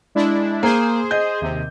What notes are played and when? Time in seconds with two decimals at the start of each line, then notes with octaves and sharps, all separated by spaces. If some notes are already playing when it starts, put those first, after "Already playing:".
0.15 G#3 D4 E4
0.63 A#3 G#4 C5
1.11 D#5 G6
1.41 D#2 C3